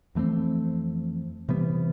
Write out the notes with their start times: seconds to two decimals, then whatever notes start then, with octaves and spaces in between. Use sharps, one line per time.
0.15 F2 E3 A3 C4
1.49 C3 E3 G3 B3